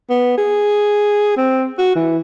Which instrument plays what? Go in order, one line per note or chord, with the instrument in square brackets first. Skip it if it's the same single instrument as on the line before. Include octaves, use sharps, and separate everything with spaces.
[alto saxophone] B3
G#4
C4
F#4
E3